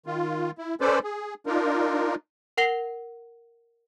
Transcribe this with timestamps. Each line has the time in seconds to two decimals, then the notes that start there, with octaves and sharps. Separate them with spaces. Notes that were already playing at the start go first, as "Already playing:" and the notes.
0.06 D#3 F4
0.58 E4
0.81 C#4 A4 B4 C5 D5
1.04 G#4
1.46 D4 D#4 F4 A#4
2.57 A#4 F#5 A#6 C7 F7 G7